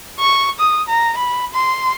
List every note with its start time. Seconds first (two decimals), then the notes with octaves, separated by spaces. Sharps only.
0.20 C#6
0.60 D#6
0.88 A#5
1.18 B5
1.54 C6